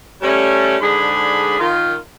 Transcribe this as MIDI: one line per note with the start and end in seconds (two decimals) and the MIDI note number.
0.23 0.76 55
0.23 0.76 57
0.23 0.76 61
0.81 1.55 44
0.81 1.55 50
0.81 1.55 62
0.81 1.55 68
0.81 1.55 83
1.59 1.94 51
1.59 1.94 65